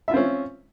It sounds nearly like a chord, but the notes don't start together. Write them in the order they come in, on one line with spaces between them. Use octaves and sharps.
E5 F4 C4 C#4